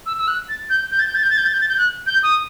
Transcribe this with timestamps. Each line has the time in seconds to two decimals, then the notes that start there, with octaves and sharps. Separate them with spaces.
0.06 E6
0.19 E6
0.28 F#6
0.49 A6
0.70 G6
0.91 G6
0.99 A6
1.07 G6
1.15 A6
1.23 G6
1.30 A6
1.38 G6
1.46 A6
1.53 G6
1.61 A6
1.69 G6
1.78 F#6
2.07 G6
2.23 D#6